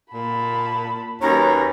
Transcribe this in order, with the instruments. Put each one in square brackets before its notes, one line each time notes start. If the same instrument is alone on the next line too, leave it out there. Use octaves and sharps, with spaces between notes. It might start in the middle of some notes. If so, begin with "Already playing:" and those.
[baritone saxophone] A#2 [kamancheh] A5 B5
[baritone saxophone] D#2 [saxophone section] D#3 F#3 C#4 [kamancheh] B4 [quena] A#5